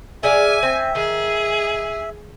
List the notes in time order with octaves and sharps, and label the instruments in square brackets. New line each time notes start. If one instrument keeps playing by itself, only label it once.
[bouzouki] G#4 D5 F5 [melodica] E5 [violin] G#5
[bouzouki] C4
[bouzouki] D#3 [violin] G#4